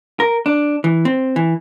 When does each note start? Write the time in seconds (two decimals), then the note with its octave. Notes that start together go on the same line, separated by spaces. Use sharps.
0.20 A#4
0.46 D4
0.84 E3
1.05 C4
1.36 E3